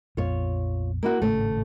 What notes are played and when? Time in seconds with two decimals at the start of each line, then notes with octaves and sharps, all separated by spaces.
0.17 A#1 F2 B3 F4 C#5
1.03 A#3 E4 F#4
1.22 G#1 A2 C#3 A3